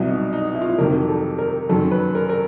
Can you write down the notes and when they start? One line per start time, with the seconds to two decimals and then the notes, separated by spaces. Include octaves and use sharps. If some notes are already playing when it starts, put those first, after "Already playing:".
Already playing: C2 B2 F#3 E4
0.09 D#4
0.33 D#4
0.55 E4
0.61 F4
0.70 E4
0.78 F2 C3 D#3 F#3 A#4
1.09 A4
1.38 A#4
1.69 F#2 D#3 F#3 A4
1.91 B4
2.15 A#4
2.29 A#4